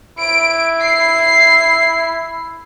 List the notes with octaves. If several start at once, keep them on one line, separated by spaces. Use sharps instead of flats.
E4 D7
C7